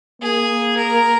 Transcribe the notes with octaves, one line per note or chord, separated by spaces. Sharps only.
A#3 G#4
A#4